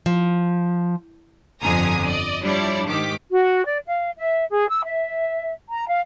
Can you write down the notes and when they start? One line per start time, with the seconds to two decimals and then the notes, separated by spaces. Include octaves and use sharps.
0.06 F3
1.62 G1 F2 D3 G#5 A#5 D#6
2.06 D5 D#5
2.41 F3 G3 D4 E4 C#5 D5
2.88 G#2 D#3 G4 D6 B6
3.31 F#4
3.65 D5
3.86 F5
4.17 E5
4.51 G#4
4.69 E6
4.83 E5
5.68 A#5
5.88 F5